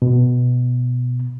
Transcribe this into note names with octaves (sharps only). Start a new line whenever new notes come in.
B2